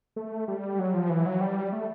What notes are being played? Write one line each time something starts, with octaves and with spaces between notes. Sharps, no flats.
A3
G3
F#3
F3
E3
F#3
G3
A3